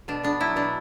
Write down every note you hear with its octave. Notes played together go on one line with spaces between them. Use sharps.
B2 D4
B3 D4
F#3 E4
B2 D4